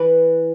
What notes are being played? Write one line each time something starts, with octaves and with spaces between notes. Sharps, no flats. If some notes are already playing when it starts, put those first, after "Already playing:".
Already playing: E3 B4